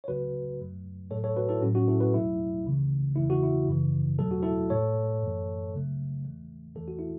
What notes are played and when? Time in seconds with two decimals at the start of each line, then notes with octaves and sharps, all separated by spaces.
0.04 C#5
0.08 C#2 C#3 F#3 A3 F#4 B4
0.59 F#2 F#3 A3
1.10 A2 F#3 A3 A4 C#5
1.24 A4 C#5
1.37 F#4 B4
1.49 E4 A4
1.62 A2 F#3 A3 C#4 F#4
1.75 C#4 F#4
1.88 E4 A4
2.00 F#4 B4
2.14 E2 B2 F#3 A3 E4
2.65 C#2 C#3 E3 A3
3.16 E2 C#3 E3 A3 E4
3.30 F#4
3.43 E4
3.67 F#2 C#3 E3
4.19 E2 B2 F#3 A3 A4
4.31 F#4
4.43 E4 A4
4.70 A2 A3 A4 C#5
5.22 F#2 E3 A3
5.73 C#2 C#3 F#3 A3
6.24 E2 E3 A3
6.75 E2 E3 A3 A4
6.88 F#4
6.99 E4